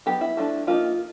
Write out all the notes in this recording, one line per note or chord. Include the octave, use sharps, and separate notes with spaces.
F#3 B3 D#4 G4
E4
F3 A3 D4
F3 A#3 D#4 F4